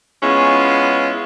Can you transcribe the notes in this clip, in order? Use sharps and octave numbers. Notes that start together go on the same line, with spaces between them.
G#3 B3 C#4 E4 F4